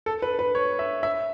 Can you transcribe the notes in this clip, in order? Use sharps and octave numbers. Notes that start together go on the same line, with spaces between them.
A4
B4
B4
C#5
E5
E5